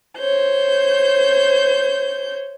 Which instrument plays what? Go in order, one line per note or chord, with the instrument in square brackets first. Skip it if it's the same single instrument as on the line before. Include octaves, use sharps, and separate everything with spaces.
[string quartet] C5 C#5 G6